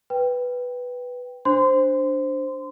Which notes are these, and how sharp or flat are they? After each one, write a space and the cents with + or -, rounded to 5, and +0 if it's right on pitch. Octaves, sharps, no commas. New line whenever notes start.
B4 +0 G5 +5
D4 +0 C5 +0 C6 -25